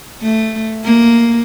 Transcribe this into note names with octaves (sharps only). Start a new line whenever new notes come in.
A3
A#3